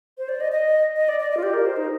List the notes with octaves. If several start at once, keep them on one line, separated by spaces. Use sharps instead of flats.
C5
D5
D#5
D#5
D#5
D5
D5
D#5
F4
G4
A#4
C5
D#4